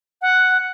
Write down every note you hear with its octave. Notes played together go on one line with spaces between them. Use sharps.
F#5